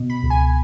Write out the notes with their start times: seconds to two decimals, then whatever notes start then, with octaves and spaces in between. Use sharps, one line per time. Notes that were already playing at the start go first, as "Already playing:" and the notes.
Already playing: B2
0.10 B5
0.23 C#2
0.30 G#5